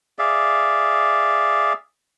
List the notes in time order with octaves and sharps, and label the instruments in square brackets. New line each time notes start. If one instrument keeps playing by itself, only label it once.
[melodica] G#4 D5 E5 F5